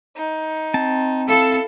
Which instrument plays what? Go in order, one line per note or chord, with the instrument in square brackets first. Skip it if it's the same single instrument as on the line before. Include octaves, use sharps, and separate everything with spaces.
[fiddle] D#4
[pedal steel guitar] C4 A5
[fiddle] E4 F5 [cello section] A4